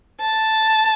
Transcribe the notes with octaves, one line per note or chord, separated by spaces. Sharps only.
A5